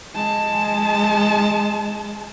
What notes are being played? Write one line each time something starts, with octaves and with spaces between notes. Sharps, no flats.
G#3 A5